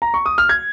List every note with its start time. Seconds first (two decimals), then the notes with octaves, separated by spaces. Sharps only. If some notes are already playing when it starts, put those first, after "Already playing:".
0.02 A#5
0.14 C#6
0.26 D#6
0.38 F6
0.49 G#6